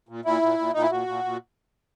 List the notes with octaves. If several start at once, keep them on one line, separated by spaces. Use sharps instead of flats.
A#2
A#2 E4
A#2
A#2
A#2 D#4
E4
A#2 F#4
A#2
A#2